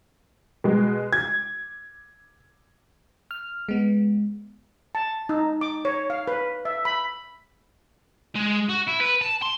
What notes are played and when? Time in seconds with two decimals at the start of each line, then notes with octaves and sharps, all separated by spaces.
0.64 B2 G#3
1.13 G#6
3.31 F6
3.69 G#3 B3
4.95 A5
5.29 D#4
5.61 D6
5.85 C#5
6.10 F5
6.28 B4
6.65 E5
6.85 B5
8.35 G#3
8.69 F#4
8.87 E4
9.01 B4
9.22 A5
9.42 C6